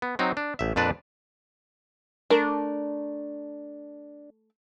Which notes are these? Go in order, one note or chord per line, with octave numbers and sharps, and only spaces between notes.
B3
F#3 C4 D#4
D4
A1 E5
F2 A#2 D4 B4 D5 A5
A3 D4 A#4